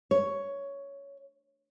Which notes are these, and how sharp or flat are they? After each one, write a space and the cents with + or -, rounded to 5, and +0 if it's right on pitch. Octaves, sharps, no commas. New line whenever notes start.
C#5 +10